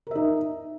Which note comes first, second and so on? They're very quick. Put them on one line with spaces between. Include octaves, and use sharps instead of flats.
A#4 E5 D#4